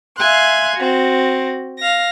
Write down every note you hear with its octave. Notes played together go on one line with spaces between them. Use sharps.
E5 F5 G#5 C6 F#6
C4 F#4
F5 A#6